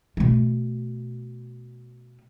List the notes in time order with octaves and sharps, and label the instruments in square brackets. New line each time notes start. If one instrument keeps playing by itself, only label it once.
[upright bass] B2 A3